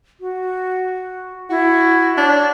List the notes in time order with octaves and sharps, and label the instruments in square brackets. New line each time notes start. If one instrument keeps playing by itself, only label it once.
[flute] F#4
[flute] E4 [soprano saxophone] F#4
[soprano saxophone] D4 [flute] C#5